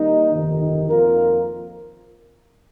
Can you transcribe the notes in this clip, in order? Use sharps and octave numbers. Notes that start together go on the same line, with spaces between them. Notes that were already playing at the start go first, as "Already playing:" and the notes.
Already playing: D#2 D#3 G3 A#3 D#4
G1 F2 C3 D#3
D#4
F2 F3 A#3 F4 A#4